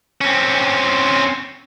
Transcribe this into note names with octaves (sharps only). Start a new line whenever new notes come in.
C4 C#4